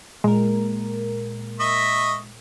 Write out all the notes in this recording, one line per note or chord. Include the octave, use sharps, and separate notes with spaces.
A#2 G#3 A#4
D#5 E5 C#6